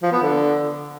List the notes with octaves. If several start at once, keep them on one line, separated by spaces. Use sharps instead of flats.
F3
B3
D3